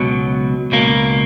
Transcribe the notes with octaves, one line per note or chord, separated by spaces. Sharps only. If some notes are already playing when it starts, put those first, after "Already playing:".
Already playing: C#2 B2 F#3
C#2 B2 A#3